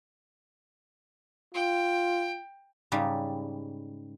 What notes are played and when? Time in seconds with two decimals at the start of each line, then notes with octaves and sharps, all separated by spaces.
1.54 F4 G5
2.92 G#2 C#3 G3